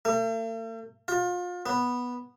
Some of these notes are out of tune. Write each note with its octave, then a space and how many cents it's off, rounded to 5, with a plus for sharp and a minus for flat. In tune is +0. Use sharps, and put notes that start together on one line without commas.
A3 +45
F4 +30
B3 -5